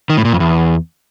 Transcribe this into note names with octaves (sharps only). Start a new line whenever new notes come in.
D#3
A2
A#2
F2
E2